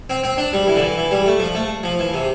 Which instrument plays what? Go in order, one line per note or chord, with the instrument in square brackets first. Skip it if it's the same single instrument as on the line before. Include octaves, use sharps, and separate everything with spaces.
[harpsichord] C4
C4
D4
G3
E3
D3
E3
E3
G3
A3
F3
A3
F3
E3
C3